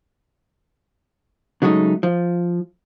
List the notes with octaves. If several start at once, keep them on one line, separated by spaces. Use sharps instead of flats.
C#3 F#3 G#3 A3 D#4
F3